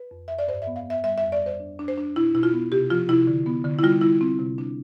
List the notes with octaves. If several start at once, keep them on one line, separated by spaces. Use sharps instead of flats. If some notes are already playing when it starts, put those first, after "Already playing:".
Already playing: B4
F2
F2 E5
D5
G2 C5
E5
B3
F5
B3 E5
G3 E5
E5
F2
D5
G3 C5
D4
D4
C5
D4
B2 E4
B2 E4
F4
B3
C3 G4
F3 F4
C3 E4
D3
B3
D3
E4
G3 F4
G3 E4
C4
C3
D4